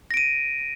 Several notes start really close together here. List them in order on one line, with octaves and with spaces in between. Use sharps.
A#6 D7 D#7